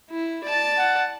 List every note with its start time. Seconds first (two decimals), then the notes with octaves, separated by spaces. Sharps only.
0.10 E4
0.44 D5 A5
0.78 F#5